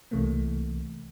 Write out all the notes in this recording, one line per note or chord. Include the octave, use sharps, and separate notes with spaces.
C2 C3 E3 A3 A#3